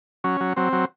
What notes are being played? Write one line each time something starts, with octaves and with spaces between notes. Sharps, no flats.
F#3 C#4
F#3
F#3 C4
F#3